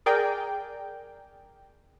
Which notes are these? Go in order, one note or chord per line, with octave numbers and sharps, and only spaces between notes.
G#4 A#4 D5 G5